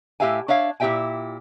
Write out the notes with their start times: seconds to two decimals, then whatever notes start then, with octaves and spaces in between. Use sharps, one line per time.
0.20 A2 B3 G4 E5 F5 G#5
0.48 D4 C#5 E5 F5
0.80 A#2 E4 G4 E5 G5 G#5